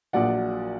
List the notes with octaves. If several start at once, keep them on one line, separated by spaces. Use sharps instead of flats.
A#1 A#2 F#3 D5 F#5